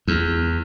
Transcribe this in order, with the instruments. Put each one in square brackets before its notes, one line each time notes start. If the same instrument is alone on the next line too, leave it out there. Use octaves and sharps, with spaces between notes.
[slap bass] E2